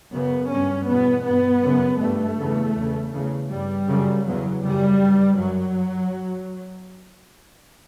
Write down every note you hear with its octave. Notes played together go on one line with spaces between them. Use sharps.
F#2 C#3 B3
G2 C#4
E2 B2 B3
G2 B3
F#2 C#3
G2 A3
E2 C#3
E2 C#3
E2 C#3
G2 G3
F#2 C#3
E2 C#3 F#3
F#2 C#3 G3
G2
F#2 F#3